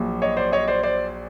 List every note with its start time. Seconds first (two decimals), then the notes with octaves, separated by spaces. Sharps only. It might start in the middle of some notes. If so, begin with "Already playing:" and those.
Already playing: A#1 A#2 F#3
0.22 C#5 D#5
0.37 C5 D5
0.52 C#5 D#5
0.68 C5 D5
0.83 C5 D5